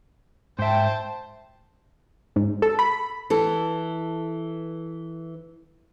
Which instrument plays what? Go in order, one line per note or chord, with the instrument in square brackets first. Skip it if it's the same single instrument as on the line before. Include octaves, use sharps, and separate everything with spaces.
[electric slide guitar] G#2 E5 [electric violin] C5 A5 [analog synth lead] G5
[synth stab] G#2
A4
B5
[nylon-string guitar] E3 A4